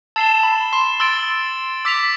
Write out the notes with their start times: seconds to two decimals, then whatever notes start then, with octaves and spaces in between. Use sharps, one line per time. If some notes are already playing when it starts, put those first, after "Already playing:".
0.16 A5 E6 A6 C7 E7 G7
0.43 B5
0.73 C6
1.00 C6 E6 A6 D7
1.85 D6 E6 B6 F7